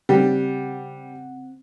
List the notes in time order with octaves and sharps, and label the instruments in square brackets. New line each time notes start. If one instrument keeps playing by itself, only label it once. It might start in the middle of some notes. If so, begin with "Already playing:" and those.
[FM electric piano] C#3 C4 F#5 [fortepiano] G3